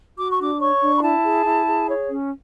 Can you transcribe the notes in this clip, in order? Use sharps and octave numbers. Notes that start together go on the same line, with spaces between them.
F#4 D6
C#6
D4 D6
C#5 C#6
D4
B5
E4 A5
G#4
E4
G#4
C#5
C#4